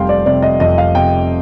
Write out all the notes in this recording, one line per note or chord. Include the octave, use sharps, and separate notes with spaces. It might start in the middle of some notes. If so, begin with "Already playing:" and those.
Already playing: F1 F2 C3 G3 F5 G5 C6
D5
C3 D5
D#5
F2 D#5
F5
C3 G5